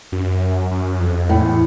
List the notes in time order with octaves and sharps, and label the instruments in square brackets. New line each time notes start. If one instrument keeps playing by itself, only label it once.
[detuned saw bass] F#2
F#2
F2
[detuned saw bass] E2 [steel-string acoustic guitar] A2